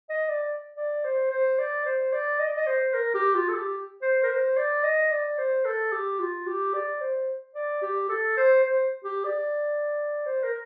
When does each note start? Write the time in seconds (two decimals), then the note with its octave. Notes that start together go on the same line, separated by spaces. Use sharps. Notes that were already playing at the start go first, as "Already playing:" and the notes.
0.09 D#5
0.29 D5
0.77 D5
1.04 C5
1.31 C5
1.58 D5
1.85 C5
2.12 D5
2.39 D#5
2.48 D5
2.56 D#5
2.67 C5
2.94 A#4
3.14 G4
3.34 F4
3.48 A4
3.55 G4
4.02 C5
4.23 A#4
4.29 C5
4.56 D5
4.84 D#5
5.11 D5
5.38 C5
5.65 A4
5.92 G4
6.19 F4
6.47 G4
6.74 D5
7.01 C5
7.55 D5
7.82 G4
8.09 A4
8.37 C5
8.63 C5
9.04 G4
9.25 D5
10.26 C5
10.44 A#4